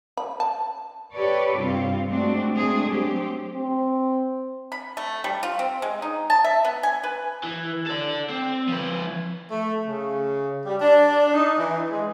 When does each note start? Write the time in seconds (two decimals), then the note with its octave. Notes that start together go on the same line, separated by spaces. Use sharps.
0.17 B5
0.40 A5
1.12 G4 A4 B4 C#5 D5
1.57 G2 C3 C4 F4
2.08 G#3 A3 C4 D4 F#4
2.56 G#3 A3 C4 D4 G#4
2.91 F#3 C4 G4
3.56 C4
4.72 B5
4.97 A3
5.24 G3
5.43 F4
5.59 C4
5.82 G#3
6.02 D#4
6.30 A5
6.44 E5
6.64 B3
6.83 G#5
7.04 B4
7.44 E3
7.87 A4 D5
8.29 C4
8.68 F3 B4
9.51 A3
9.86 C#3
10.66 G3
10.80 D4
11.34 D#4
11.58 E3
11.91 G#3